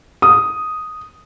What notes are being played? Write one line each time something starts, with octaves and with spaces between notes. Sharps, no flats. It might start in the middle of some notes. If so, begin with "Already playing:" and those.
D#6